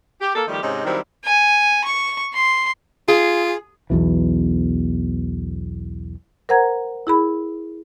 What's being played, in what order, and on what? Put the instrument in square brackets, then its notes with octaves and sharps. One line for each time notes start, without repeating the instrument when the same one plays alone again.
[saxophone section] G4
A#3 A4
D#3 F3 G3 A3 D#4 G4
G#2 C3 C#4 D#4
D#3 F#3 G3 C4 D4 E4
[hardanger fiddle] G#5
C#6
C6
[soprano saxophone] F4 [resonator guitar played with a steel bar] G#4
[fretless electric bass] B1 E2 B2 E3
[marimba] A#4 C5 F#5 A#5 G#6
E4 G#4 B5